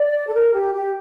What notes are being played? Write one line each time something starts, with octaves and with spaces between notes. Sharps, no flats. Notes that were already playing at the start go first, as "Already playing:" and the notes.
Already playing: D5
A4
A#4
G4
G4